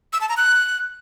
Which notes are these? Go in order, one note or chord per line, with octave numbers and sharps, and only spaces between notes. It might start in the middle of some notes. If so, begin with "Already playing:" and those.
E6
A5
A#5
F#6